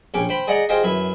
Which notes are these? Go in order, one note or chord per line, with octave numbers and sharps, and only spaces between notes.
A#1 C#4 G4 D6
C5 G5 B5
G#4 D5 D#5 F#5 A#5
F4 G4 G#4 C5 D#5 G5
F#2 E4 B4